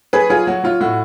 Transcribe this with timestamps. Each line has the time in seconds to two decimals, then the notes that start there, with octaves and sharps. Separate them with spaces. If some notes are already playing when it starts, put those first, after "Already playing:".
0.13 F#3 G#4 B4
0.30 F#3 F4 G#4
0.47 F#3 F#4
0.64 F#3 F4
0.80 A2 F#4